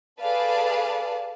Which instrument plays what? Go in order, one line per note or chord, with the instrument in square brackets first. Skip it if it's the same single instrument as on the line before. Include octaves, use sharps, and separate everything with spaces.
[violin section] G#4 A4 B4 D5 F5 A5